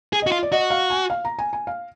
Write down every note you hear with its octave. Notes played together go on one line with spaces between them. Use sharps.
G#4
F#4 D#5
F4
D5
F#4 D#5
F5
G#5
F5
A#5
G#5
G#5
F5